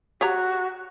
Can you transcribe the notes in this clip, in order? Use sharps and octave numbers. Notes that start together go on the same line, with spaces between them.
F#4 G4 C#5 A#5